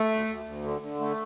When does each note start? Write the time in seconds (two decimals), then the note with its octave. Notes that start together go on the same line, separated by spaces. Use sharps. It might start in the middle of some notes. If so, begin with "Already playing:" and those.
Already playing: A3
0.10 D2
0.27 D2
0.45 D2
0.64 D3
0.81 D3
1.00 A3